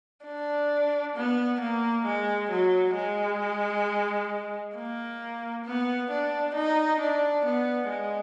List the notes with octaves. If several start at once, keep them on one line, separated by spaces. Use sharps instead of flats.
D4
B3
A#3
G#3
F#3
G#3
A#3
B3
D4
D#4
D4
B3
G#3